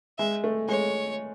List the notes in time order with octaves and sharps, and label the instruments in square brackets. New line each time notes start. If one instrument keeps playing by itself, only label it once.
[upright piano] G#3 [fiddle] E5
[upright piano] A3
[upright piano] G#3 [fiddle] C#5